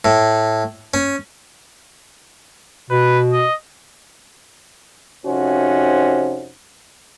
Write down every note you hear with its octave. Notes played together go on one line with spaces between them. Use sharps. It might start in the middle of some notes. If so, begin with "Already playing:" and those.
A2
C#4
B2 B4
D#5
F2 C3 C#4 D#4 F#4 C5